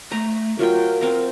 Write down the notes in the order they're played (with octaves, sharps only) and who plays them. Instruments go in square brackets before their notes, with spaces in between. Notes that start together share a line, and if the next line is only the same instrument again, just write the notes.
[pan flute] A3 [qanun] A#5
[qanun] F#3 F4 G5 [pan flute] A#4
[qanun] C4 A#5 [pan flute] A#4